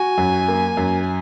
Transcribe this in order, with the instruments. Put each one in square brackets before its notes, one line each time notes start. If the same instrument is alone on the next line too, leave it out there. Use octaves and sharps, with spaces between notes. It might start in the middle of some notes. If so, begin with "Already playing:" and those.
Already playing: [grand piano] F#4 [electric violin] G#5
[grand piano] F#2
A#3
F#2